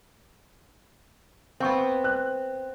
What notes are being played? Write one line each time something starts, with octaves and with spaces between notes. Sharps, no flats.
B3 C4 F5 C#6
F#6